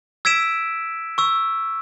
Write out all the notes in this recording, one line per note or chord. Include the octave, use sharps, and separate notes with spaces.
E6 G#6 B6 D7 E7
C#6 E6